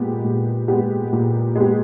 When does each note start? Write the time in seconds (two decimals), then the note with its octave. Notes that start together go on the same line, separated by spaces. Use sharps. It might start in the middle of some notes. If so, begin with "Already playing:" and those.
Already playing: A#2 G#3 B3 G4
0.24 A#2
0.68 G#3 B3 G4
1.12 A#2
1.55 G#3 B3 G4